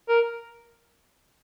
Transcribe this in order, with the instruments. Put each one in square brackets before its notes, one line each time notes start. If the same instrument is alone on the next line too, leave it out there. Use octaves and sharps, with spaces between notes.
[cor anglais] A#4